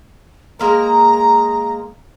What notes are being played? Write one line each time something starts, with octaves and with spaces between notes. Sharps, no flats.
G#3 A#3 A#4 A#5